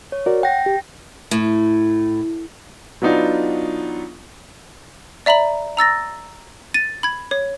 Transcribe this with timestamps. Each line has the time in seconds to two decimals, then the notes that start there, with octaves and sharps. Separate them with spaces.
0.12 C#5
0.26 F#4 A#4 D5
0.43 F#5 G5 A#6
0.66 G4
1.31 A2
3.02 F#3 B3 D4 D#4 F4
5.26 D5 E5 A#5 B5 F#7
5.77 A#5 E6 A6 A#6
6.74 A6 D#7
7.03 B5 G#6
7.31 C#5